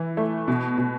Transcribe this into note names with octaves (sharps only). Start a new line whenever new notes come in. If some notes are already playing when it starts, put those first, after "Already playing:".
Already playing: E3 E4
A3
B2
B2